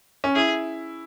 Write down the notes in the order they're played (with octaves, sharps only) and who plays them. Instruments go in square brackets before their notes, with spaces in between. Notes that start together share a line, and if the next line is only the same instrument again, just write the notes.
[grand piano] C#4
[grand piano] E4 [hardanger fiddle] G#4